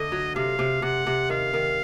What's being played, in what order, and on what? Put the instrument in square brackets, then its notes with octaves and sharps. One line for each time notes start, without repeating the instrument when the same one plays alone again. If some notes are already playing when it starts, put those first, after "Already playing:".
Already playing: [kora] D3 A3 [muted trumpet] D#5
[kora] F#3
[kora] C3 [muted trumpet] F5
[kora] C3
[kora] C3 [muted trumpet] F#5
[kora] C3
[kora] D#3 [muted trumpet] F5
[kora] D#3